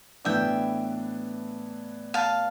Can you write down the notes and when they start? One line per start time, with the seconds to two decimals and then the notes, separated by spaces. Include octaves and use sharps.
0.25 A2 E3 B3 D4 E5 G5
2.14 F5 A5